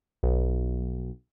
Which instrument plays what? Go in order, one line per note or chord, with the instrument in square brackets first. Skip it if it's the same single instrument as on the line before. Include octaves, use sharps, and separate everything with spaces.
[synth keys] B1